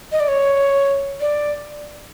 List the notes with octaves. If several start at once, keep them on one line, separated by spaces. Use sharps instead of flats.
D#5
D5
C#5
D5